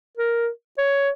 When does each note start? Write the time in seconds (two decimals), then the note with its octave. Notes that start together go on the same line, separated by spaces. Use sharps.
0.17 A#4
0.78 C#5